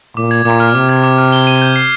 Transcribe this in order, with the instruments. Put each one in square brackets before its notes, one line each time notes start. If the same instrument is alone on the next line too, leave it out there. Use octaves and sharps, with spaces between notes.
[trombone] A#2 [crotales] D6
[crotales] G#6
[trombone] A#2 [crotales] D6
[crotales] F6
[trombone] C3 [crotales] D6
[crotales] G#6
D6
F6
G7
D#7
G6
C7